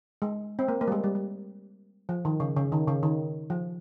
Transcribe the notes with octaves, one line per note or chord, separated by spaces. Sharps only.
G#3
C4
A#3
A#3
G3
G#3
G3
G3
F3
D#3
C#3
C#3
D#3
C#3
D#3
F3